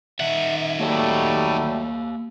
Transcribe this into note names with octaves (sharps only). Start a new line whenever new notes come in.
D#3 E5 F#5
F#3 G3 A3 A#3 G4